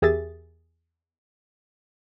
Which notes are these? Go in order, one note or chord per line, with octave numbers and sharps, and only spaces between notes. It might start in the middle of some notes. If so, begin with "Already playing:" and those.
E2 G4 G#4 A#4 E5 A6